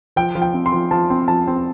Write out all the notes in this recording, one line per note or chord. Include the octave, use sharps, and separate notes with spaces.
F3 G5
F3
G5
C4
C6
F3
F3 A5
C4
F3 A5
C4